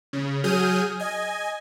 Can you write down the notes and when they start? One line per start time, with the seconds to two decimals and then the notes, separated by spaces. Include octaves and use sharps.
0.13 C#3
0.44 F#3 G#4 D#6 F6 G6 D#7
1.00 D#5 G#5